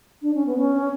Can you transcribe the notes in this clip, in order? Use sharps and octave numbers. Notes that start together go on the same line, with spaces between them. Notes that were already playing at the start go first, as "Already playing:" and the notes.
D4
C#4
B3
C#4